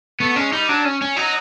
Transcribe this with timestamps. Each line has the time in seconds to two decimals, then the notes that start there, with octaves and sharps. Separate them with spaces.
0.20 A3 B3
0.36 G#3 C#4
0.52 G3 D#4
0.68 F#3 D4
0.85 C#4
1.01 C#4
1.16 F#3 D#4